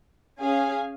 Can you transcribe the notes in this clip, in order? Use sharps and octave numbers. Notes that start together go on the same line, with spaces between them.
C#4 G#4 F5 G#5